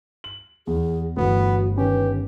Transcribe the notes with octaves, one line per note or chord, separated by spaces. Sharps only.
F#7
E2 G#4
G1 E3 A3 B3 F#4
D#3 C#4 G4 B4